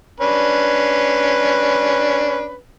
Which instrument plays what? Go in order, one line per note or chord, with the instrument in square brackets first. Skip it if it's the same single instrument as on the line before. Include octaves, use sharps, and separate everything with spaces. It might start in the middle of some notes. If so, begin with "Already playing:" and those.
[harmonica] C#4 D4 B4